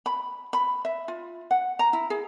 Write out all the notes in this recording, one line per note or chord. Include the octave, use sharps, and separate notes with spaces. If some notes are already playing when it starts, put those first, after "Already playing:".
B5
B5
E5
F4
F#5
A#5
E4
G#4